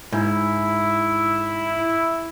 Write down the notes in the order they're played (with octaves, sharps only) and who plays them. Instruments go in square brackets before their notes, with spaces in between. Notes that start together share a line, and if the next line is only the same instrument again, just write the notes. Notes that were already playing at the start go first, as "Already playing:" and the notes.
[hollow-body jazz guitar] G#2 [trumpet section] E4